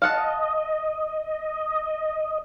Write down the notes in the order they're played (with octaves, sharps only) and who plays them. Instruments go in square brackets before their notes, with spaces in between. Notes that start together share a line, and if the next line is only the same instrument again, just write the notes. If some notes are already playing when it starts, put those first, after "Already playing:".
[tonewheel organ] D#5 [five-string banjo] F5 F#5 A5